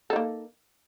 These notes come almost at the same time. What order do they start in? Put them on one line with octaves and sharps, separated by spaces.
A4 D#4 A#3